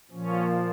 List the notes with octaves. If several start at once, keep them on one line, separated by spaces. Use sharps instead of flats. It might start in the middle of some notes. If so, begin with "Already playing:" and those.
A#2 F3 C#4